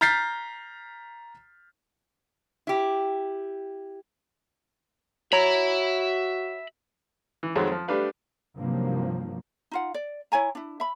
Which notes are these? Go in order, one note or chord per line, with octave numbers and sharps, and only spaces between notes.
A#5 F6 G6 A6 B6 C7
E4 G4
F#4 C#5 E5 A#5 B5
E3
F2 D#3 F#3 G#3 C4
F3
G3 A3 D4 G4 B4 F5
G2 C3 D#3 F3 F#3 A#3
D#4 F4 F#5
D5
E4 C#5 G#5 A#5
D4 E4
E5 B5